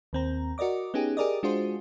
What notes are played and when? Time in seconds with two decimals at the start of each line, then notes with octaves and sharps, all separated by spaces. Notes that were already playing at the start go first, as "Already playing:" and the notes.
0.13 D#2 C4 A#5
0.58 F#4 A#4 D5 D#5 D6
0.94 B3 C#4 D#4 G4 G#4
1.17 G4 G#4 A#4 D5 D#5
1.43 G#3 D4 F4 F#4 G#4 C5